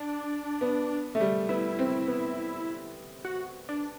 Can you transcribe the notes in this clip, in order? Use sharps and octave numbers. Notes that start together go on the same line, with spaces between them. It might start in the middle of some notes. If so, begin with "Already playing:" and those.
Already playing: D4
B3
A3
G3
B3 E4
C4
B3
F#4
D4